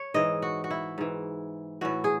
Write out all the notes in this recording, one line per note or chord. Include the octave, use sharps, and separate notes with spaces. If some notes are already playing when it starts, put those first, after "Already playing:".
Already playing: C#5
G#2 E3 D#5
F#4
F#4
E4
G#2 E3
A2 E3 F#4
G#4